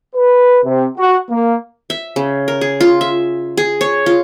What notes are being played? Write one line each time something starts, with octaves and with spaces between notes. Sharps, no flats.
B4
C3
F#4
A#3
E5
C#3
A#4
G#4
F4
E5
G#4
C#5
F4